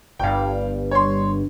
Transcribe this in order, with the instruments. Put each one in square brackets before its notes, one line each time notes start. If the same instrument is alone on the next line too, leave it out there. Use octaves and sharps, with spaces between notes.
[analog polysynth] G1 G2 [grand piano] F5 G5
[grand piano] C#5 C6